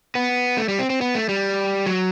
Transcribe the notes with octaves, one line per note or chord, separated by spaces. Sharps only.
B3
A3
G3
C4
C4
B3
A3
G3
F#3